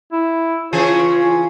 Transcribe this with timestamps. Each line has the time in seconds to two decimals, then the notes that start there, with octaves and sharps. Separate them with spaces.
0.12 E4
0.73 C#3 E3 F4 G#4 C#5